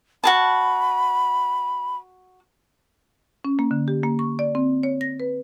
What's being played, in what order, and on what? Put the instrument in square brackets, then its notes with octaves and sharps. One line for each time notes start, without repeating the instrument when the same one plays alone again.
[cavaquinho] F#4 G#4 A5 [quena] B5
[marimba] C#4
A#3
D3
G4
A#3
C#6
D5
C4
C#5
A#6
B4